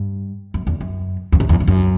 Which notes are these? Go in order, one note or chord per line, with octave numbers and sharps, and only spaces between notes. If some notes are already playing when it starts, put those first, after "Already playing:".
Already playing: G2
F#2
E2
F#2
E2
F#2
E2
E2
F#2